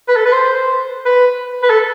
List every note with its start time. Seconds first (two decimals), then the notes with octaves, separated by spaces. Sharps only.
0.08 B4
0.16 A4
0.26 B4
0.33 C5
1.06 B4
1.63 B4
1.70 A4